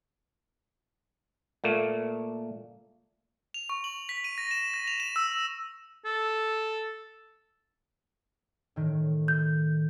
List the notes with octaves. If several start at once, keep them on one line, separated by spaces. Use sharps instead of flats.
A#2 A3 A#3
F7
C#6
F#7
B6
D#7
A#6
E7
A#6
F7
E7
E6
A4
A2 D#3
G6